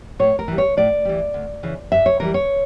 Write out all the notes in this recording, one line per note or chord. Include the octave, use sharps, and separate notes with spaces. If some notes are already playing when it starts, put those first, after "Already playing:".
A2 C#5
A#4
E3 G3
C#5
A2 D5
E3 G3
D2
C#3 E3
G2 E5
C#5
E3 G3 A#4
C#5